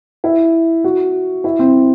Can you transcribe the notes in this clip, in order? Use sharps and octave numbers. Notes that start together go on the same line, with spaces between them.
E4
F#4
E4
C4